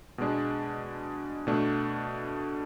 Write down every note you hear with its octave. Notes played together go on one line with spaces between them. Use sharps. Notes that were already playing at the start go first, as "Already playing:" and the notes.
B2 G#3 D4
B2 A3 D4